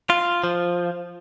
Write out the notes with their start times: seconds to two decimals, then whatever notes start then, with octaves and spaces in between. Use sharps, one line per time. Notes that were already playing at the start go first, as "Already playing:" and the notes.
0.10 F4
0.44 F3